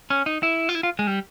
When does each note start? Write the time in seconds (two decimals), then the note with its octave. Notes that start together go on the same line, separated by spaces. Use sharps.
0.10 C#4
0.26 D#4
0.43 E4
0.69 F4
0.75 E4
0.83 F4
0.99 G#3
1.07 G3